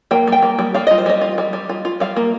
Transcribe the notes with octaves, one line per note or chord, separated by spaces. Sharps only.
A#3 G5
G3 G5
A#3
G3
G3 F5
F4 D#5
C5
G3 D#5
F4
G3
G3
F4
F4
G3 F5
A#3